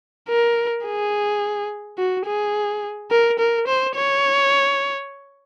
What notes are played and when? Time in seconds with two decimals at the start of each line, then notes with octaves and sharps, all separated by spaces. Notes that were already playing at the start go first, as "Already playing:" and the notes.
0.29 A#4
0.85 G#4
1.98 F#4
2.26 G#4
3.11 A#4
3.39 A#4
3.67 C5
3.95 C#5